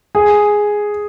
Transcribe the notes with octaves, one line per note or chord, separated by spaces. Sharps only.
G#4